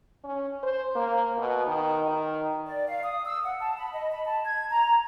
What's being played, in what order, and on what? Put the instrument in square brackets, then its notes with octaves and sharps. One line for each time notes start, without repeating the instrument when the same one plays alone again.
[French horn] C#4
C5
A#3
B2
D#3
D#3
[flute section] D5
F5
D#6
E6
F#5
A5
B5
D#5
B5
A5
G#6
A#5